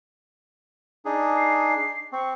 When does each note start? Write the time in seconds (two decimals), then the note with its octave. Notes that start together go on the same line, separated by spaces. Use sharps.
1.05 D4 D#4 G#4
1.37 C7
2.13 C4 C#6